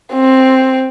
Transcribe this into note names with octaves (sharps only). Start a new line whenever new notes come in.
C4